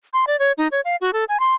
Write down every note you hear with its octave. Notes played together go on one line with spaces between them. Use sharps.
C6
D5
C#5
D#4
C#5
F5
F#4
A4
G#5
C6